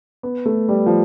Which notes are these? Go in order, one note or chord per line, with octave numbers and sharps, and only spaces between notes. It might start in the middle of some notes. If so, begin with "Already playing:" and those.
B3
A3
G3
F3